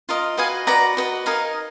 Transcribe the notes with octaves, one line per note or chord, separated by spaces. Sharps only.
F4 A#4 D#5
F#4 B4 D#5 F5 G#5
F#4 B4 D5 F#5 A#5
F#4 B4 D#5
D#4 A#4 D#5 F5 G#5